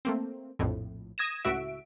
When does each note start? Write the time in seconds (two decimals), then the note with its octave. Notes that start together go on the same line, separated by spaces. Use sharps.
0.05 A3 A#3 C4
0.59 A#1 F2 A2
1.18 D#6 G#6 A#6 E7
1.44 C#2 A2 F#4 E5 D7